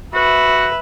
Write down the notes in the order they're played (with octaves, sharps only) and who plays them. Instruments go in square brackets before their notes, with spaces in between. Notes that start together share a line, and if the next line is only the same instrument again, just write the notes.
[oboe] F#4 [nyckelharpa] B4 E5